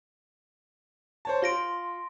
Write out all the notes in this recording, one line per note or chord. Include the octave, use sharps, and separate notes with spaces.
C5 C#5 A5
F4 C6 A#6 D7